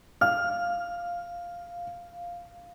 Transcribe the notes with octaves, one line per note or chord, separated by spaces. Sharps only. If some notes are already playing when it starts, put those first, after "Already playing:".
F5 F6